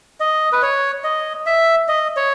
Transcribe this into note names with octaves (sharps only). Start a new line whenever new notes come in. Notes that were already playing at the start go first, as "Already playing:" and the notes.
D#5
B4
C#5
D#5
E5
D#5
C#5